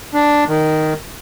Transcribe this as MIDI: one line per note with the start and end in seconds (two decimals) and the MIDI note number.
0.14 0.44 62
0.48 0.93 51